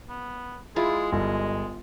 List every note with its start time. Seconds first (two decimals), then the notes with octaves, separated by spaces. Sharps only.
0.09 B3
0.76 G#3 E4 F4 G#4
1.13 G1 D#5